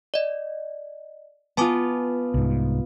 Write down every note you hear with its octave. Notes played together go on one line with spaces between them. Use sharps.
D5 D#5
B3 F4 G#5 A5 D6
C2 G#2